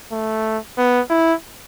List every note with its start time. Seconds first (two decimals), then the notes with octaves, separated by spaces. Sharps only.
0.12 A3
0.78 B3
1.10 E4